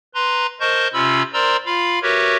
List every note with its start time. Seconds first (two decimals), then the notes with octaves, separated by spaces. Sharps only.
0.15 B4 A#5 C6
0.60 A#4 C5 D#5 A5 C#6 G6
0.94 C3 C#4 F4 B5 E6
1.33 A#4 C5 D5 A#5 C6 E6
1.66 F4 F5 B5
2.02 F#4 G4 A#4 B4 C#5 E5